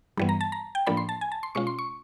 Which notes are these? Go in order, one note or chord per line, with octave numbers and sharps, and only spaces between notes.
G2 E3 G3 B3
A#5
A5
A#5
G5
A2 F3 A#3 D4 B5
C6
A5
G#5
A5
C6
B2 G#3 C#4 F4 C#6
C6
C#6